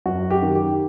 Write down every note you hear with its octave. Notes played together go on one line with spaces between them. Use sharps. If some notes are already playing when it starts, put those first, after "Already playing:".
F#2 F#4
G4
D#3
G4